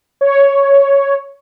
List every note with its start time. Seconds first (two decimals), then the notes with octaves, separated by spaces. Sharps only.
0.21 C#5